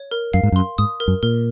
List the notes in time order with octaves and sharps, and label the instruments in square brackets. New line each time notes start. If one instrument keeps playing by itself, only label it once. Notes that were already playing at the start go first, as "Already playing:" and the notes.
Already playing: [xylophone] C#5
A#4
[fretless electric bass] F#2 [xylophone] F5
[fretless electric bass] G#2
F#2
[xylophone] C6
[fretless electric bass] G#2 [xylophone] D#6
[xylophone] A#4
[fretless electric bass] F#2
[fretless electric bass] A#2 [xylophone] A#4